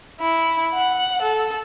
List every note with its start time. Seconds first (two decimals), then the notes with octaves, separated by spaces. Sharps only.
0.21 E4
0.74 F#5
1.22 A4